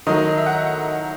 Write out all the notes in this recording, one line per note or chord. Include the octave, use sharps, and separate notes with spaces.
D#3 F#3 A3 D#5
E5
F#5